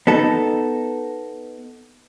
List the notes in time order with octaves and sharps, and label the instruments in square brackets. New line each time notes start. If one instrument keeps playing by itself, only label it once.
[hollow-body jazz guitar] B3 D#4 A4